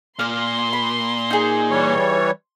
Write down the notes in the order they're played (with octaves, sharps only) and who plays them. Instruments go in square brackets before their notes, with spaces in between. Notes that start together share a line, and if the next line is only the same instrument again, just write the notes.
[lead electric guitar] A#2 [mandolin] F5 F6 [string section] C6
[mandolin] B5
D#4 G#4
[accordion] E3 G3 C#5